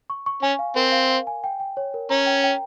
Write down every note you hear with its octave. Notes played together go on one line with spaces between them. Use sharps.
C#6
C#6
C#4 G#5
F5
C4 A#4
F5
F5
G#5
G5
G5
C#5
A#4
C#4 A#5
G5
G5